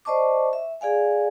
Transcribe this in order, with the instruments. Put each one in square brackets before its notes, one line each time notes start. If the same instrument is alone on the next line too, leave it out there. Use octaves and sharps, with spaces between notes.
[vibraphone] C5 D5 D#5 A5 C#6 D6
E5
G#4 D5 F5 G#5